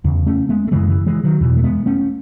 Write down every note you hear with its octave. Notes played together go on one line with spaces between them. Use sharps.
E2 C#3
A3 C#4
G#3 B3
A3
F#2 C#3 E3 G#3
E3
E3 G#3
D#3 F#3
E2 B2 E3
A3
G#3 B3
A3 C#4